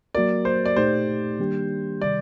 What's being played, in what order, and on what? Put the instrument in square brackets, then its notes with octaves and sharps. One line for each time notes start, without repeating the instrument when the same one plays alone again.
[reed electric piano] F#3 A#3 F#4 A#4 [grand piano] D5
[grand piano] C5
D5
[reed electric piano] A#2 A3 D#4 G4 [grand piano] C5
[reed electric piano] D#3 G3 A#3 D4 G4
[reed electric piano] C3 D#3 G3 [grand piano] D5